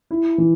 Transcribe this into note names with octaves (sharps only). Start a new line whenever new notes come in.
E4
E3